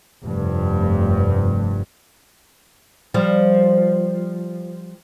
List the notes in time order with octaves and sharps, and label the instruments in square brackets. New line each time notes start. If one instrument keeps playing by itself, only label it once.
[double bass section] F1 G2
[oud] F3 G3